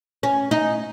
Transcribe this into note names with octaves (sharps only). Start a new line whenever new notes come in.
C#4
D#4